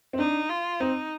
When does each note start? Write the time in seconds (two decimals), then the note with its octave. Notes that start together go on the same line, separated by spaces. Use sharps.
0.13 C4
0.19 D4 D#4
0.50 F4
0.80 C4 D#4